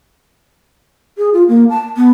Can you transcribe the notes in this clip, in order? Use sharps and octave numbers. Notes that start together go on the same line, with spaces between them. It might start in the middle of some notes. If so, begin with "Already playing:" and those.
G#4
F4
A#3
A5
B3